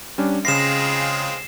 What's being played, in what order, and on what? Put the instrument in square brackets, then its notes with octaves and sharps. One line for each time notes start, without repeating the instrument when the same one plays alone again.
[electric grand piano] G3 C#4 D4
[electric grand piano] C#3 A#6 [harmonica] G#3 C4 F4 [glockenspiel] C7 E7